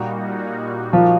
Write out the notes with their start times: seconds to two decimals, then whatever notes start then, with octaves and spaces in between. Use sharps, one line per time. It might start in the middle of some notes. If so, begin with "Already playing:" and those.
Already playing: A#2 G3 A#3 D#4 F#4
0.93 F3 F4